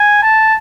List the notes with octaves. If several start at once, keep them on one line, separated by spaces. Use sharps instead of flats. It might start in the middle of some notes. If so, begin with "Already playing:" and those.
Already playing: G#5
A5